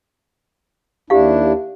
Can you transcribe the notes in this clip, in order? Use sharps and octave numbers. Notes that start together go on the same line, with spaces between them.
D#2 D4 E4 G4 F5